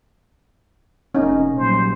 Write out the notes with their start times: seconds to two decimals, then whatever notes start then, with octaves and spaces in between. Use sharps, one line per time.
1.15 F1 A#3 C#4 D#4
1.58 A#1 F#3 G3 C5